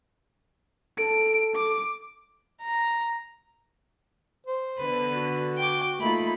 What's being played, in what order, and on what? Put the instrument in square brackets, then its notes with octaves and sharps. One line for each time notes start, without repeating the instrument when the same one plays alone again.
[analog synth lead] A4 [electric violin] D7
[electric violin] D6
[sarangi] A#5
[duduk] C5
[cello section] D3 B3 [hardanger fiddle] B4
[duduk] F#4
[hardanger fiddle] G5 D6
[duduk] A3 [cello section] A#3 D#4 F4 [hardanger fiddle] B5